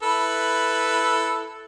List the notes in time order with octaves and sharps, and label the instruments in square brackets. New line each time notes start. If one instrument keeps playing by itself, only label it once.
[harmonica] E4 A4 B4